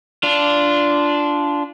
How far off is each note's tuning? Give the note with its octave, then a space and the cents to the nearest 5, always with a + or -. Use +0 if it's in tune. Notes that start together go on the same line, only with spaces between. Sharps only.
D4 -10 F4 -15